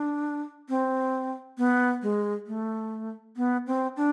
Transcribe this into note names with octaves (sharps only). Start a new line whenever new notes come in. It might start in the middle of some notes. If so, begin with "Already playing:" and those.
Already playing: D4
C4
B3
G#3
A3
B3
C4
D4